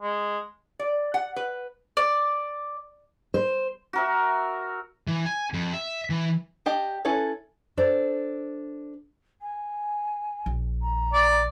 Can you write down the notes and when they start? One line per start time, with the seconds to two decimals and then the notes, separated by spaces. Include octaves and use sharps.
0.02 G#3
0.79 D5
1.14 F#5
1.36 B4
1.97 D5
3.34 C5
3.93 F#4 A#4 E5
5.07 E3
5.26 G#5
5.54 F2
5.73 E5
6.10 E3
6.66 D4 G4 D#5
7.05 C#4 E4 A4 B4 C#5
7.77 D4 A4 C5 D5
9.41 G#5
10.46 A#1
10.82 A#5
11.13 D5